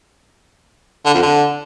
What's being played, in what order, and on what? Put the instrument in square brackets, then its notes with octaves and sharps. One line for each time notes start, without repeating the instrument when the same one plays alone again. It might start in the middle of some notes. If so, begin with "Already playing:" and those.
[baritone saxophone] D3
F2
D3